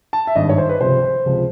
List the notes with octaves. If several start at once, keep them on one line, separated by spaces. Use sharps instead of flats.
A5
E5
G#1 G2 D#3 D#5
C#5
C5
B4
C#2 C3 F3 C5
C#2 C3 F3